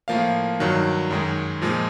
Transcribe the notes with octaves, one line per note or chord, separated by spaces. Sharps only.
A2 F3 A#3 F5
G2 D#3 F#3
F#2 D#3 G#3
A#2 F3 G#3